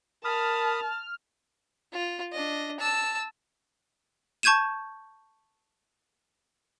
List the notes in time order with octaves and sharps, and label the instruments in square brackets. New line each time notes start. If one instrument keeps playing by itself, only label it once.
[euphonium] A#4 [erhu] A5 [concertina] B5 D#6 [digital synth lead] F6
[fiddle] F4
D4 D#5
A5 E6
[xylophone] A5 C#6 G6 G#6 D#7 E7